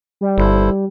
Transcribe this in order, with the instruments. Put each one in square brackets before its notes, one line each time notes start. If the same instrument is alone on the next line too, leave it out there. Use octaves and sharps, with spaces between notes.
[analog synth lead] G3
[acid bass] G1 [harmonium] E4 A4 C5